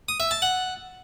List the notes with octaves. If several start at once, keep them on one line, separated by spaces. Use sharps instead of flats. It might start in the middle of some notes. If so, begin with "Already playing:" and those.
D#6
E5
A5
F#5